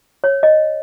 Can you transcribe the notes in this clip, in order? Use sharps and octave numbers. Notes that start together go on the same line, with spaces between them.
C#5
D#5